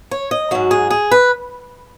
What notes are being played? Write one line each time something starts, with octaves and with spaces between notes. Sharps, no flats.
C#5
D#5
G#2 F#3 F#4
G#4
G#4
B4